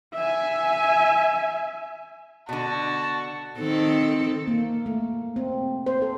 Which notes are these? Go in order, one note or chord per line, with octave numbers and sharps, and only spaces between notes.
E5 G#5
B2 D3 F#4 A5
D#3 C4 A4
A#3
A3
C4
C5
A4